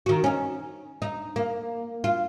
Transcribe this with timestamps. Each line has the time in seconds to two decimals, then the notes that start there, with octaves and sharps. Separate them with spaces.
0.06 D#3 F#4
0.24 C#4 D#4
1.02 D#4
1.36 A#3
2.04 F4